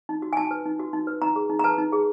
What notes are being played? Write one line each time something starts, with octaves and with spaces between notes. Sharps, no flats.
D#4
F#4
G#5
D#4 A5
B4
D#4
F#4
D#4
B4
D#4 A#5
G#4
D#4
A#5
B4 A5
D#4
G#4